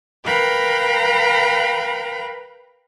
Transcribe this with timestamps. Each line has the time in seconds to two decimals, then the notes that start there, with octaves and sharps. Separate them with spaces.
0.24 A#4 B4 F5 G5 A#5 B5